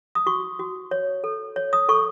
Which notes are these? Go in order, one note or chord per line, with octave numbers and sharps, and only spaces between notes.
D#6
F#4 C#6
F#4
C#5
A4
C#5
D#6
A4 C#6